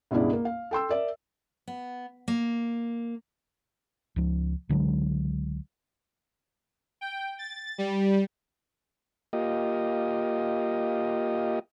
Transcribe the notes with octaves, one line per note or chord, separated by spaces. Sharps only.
C#2 G2 B2 G#3 E4 D5
A#3
F5
A4 G5 C6 E6
A#4 D5 E5
B3
A#3
C#2 F3
C#2 D3 F#3 G#3
G5
A6
G3
A#3 F4 G4 D#5